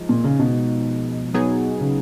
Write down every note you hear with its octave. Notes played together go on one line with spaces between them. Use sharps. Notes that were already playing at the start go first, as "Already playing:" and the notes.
Already playing: F3 G#3 D#4
A#2
C#3
B2
F#3 B3 D#4 G#4
C#3